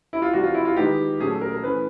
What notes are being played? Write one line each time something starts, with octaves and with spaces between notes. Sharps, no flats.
E4
F4
C3 E3 G3 F#4
F4
E4
F4
D#3 G#3 B3 D#4 G4
A#2 F#3 A3 C#4 G#4
A4
A#4
A#4
E3 A3 C#4 B4